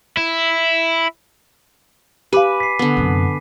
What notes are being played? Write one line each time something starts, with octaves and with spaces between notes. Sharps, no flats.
E4
G4 B4 F5 G#5 D6 D#7
B6 C7
D3 B3
F#2 C3